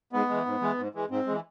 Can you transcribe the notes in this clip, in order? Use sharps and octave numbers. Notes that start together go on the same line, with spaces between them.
G#2 B3
E3 G#3
G#2
E3 G#3
G#2
E3 G#3
G#2 C4
E3 G#3